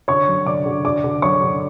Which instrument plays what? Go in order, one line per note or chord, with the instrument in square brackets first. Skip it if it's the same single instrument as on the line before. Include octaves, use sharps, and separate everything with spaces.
[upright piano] D3 C#5 C#6
F#3
D3 D5 D6
D3
D3 D5 D6
D3
F#3 C#5 C#6
D3